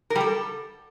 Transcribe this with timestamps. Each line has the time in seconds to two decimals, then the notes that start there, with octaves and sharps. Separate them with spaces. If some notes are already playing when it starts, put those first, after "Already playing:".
0.10 A#4
0.15 G3
0.21 A4